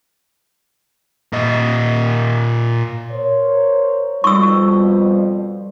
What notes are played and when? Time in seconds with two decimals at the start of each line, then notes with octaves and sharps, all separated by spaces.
1.33 A#2 D#5
3.11 A#4 C5 C#5
4.24 F2 B2 F3 G3 C#6 E6